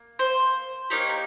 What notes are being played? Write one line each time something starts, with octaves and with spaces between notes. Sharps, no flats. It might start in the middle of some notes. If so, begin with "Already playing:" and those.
Already playing: A#3
C5
A#3 D#4 G4 C#5
A#4